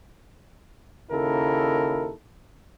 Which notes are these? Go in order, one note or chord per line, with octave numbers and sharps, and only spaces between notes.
D#2 C#3 E4 A4 A#4